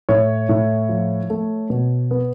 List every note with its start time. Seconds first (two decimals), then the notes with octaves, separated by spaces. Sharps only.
0.09 A2 C#5
0.49 A2
0.89 F3
1.30 A3
1.70 B2
2.11 B3